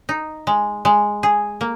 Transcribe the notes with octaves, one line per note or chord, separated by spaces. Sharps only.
D#4
G#3
G#3
G#4
A#3